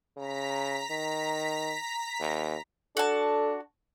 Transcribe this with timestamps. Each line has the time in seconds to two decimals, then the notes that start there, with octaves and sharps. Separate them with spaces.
0.17 C#3 A#5 B6
0.90 D#3
2.20 D#2
2.97 D4 F#4 A4 A5